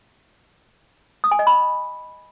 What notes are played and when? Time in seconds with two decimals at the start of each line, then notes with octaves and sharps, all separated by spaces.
1.24 D#6
1.31 G#5
1.39 D#5
1.47 B5